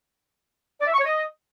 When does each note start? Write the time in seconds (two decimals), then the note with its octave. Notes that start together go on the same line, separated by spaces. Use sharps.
0.81 D5
0.87 E5
0.93 C#6
0.99 C#5
1.05 D#5